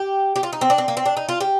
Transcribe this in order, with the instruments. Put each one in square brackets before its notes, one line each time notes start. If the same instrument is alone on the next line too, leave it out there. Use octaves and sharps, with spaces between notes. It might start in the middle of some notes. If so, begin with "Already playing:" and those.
Already playing: [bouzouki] G4
G4
F4
D#4
C4
D4
C4
A#3
C4
D4
D#4
F4
G4